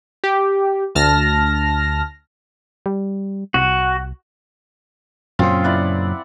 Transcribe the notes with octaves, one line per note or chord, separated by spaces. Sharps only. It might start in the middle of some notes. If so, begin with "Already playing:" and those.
G4
D2 A5 F6 A#6
G3
C2 F#4
F#2 A#2 C#3 C4 F4
E4 D5 F#5